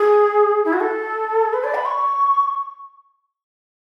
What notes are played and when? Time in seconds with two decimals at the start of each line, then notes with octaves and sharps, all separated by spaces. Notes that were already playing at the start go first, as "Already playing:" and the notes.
Already playing: G#4
0.65 E4
0.73 F#4
0.81 A4
1.53 B4
1.64 D5
1.75 B5
1.85 C#6